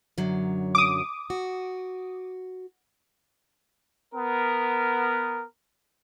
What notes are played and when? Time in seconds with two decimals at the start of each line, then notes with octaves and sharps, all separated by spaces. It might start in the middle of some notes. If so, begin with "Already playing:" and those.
0.18 F#2 D3 F#3
0.75 D6 D#6
1.30 F#4
4.15 B3 A#4